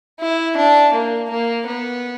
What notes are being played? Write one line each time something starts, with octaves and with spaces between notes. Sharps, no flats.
E4
D4
A#3
A#3
B3